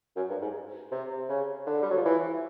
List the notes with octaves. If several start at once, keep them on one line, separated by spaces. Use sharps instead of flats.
F#2
G2
G#2
C3
C#3
D3
G3
F#3
F3
E3